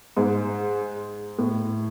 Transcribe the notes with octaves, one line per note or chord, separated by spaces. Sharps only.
G#2
A2